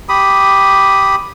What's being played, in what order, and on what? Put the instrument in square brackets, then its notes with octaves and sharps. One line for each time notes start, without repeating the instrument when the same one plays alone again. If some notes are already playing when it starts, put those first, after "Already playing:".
[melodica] G4 B5 D#6